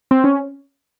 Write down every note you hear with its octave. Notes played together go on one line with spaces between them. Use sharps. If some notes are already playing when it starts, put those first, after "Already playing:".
C4
C#4